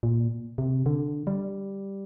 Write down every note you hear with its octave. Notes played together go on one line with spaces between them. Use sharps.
A#2
C3
D3
G3